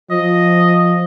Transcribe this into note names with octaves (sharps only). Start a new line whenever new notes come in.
F3 D#5